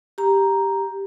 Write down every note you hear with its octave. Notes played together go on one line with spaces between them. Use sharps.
G4 A#5